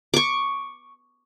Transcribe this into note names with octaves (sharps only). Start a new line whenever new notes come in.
C#6 D6